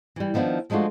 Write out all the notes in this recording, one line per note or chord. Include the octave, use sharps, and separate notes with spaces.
E3 G3
D#3 F3 B3 D4 E4
F3 G#3 A3 D4 F4 F#4